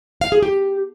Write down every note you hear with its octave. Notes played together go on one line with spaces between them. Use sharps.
F5
G#4
G4